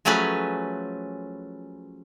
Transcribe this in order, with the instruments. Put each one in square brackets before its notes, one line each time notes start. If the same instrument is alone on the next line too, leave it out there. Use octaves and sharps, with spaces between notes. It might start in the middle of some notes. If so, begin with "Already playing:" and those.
[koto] F3 F#3 A3 C#4 G#4 B4